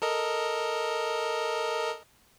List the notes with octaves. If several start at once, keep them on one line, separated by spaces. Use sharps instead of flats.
A4 A#4 D#5